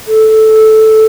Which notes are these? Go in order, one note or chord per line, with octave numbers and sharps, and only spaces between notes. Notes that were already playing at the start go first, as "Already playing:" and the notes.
A4